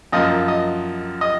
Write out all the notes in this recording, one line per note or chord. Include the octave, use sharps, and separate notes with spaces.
F#2 F3 A#3 D#5
D#5
D#5